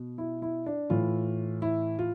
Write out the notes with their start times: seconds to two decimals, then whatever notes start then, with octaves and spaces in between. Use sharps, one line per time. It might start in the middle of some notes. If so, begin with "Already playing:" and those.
Already playing: B2
0.18 E4
0.42 E4
0.66 D4
0.90 A2 E3 F4
1.62 E4
1.99 F4